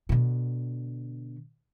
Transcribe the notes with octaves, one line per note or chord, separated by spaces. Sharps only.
B2 D3